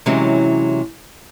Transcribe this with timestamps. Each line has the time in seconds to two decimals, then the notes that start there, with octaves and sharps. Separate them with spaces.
0.06 C3 E3 F#3 G#3 C#4 G4